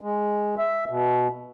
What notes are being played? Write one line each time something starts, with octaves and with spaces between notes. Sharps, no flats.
G#3
E5
B2